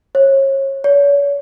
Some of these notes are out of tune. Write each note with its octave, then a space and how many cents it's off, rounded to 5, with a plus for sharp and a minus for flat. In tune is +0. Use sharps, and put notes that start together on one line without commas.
C#5 -35
C#5 +40